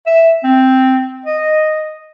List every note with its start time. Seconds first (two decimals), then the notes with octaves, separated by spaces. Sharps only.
0.07 E5
0.44 C4
1.26 D#5